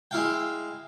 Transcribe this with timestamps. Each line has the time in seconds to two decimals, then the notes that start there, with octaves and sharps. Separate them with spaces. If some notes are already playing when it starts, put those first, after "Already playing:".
0.11 G#3 E4 F5 G5